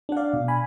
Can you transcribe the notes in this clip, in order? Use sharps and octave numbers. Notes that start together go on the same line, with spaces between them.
D4 F#5
D5 F5
B2
G#5 B5